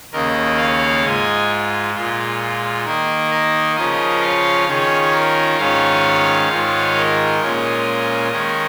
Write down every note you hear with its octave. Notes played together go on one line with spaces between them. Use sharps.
D#2 C#3 A#3 A#4 D#5
C#5 F5
G#2 G#3 F4 D#5 G#5
A#2 G#3 F4
D#3 A#3 D#4 A#4
A#4 D#5
C#3 F3 C#4 F4 A#4 D#5
C#5 F5
D#3 C#4 F4 G#4 C#5
A#4
G#2 D#3 C#4 F4 C#5 F5
G#2 D#3 G#3 F4
A#4 D#5
A#2 G#3 C#4 F4
D#3 G#3 C#4 A#4